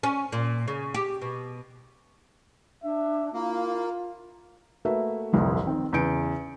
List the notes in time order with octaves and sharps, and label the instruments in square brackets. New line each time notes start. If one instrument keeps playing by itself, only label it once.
[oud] C#4
A#2
C#3
G4
B2
[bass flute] D4 [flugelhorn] E5
[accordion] A#3 [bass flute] E4 [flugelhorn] F4
[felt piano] A3 A#3 F#4 B4 E5
G1 C2 F2
D#3 C4
E2 C#3 B4 G6 C#7 D7